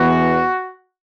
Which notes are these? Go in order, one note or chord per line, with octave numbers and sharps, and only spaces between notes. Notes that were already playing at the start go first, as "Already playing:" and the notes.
Already playing: E2 E3 B3 F#4